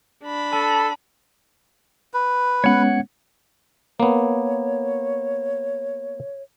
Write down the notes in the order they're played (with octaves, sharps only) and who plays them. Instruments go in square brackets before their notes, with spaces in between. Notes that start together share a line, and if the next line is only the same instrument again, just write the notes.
[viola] D4 B5
[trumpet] A4 [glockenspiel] A5
[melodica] B4
[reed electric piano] G#3 B3 C#4 [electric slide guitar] C#5 F#5
[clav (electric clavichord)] A#3 B3 [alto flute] C#5